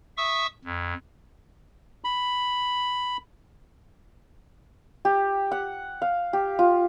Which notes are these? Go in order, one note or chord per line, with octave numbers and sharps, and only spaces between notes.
E5 C#6 D#6 E6
F2
B5
G4
F#5
F5
G4
F4